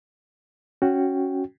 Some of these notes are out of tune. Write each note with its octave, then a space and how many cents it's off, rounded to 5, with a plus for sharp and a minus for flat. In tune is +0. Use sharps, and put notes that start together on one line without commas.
C#4 +0 F#4 +0 G5 +0